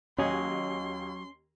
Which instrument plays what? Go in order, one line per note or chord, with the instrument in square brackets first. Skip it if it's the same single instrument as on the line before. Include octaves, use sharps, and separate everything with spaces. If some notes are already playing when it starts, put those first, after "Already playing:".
[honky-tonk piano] D#2 D#5 [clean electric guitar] F#3 G#4 [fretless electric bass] C#4 [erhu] C6